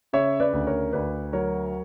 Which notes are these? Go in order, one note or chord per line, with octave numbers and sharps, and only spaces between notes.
C#3 C#5 E5
B4 D5
D2
A#4 C#5
D2 B4 D5
F#3 A#4 C#5